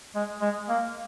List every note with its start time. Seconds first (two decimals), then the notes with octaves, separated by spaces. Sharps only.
0.15 G#3
0.41 G#3
0.69 A#3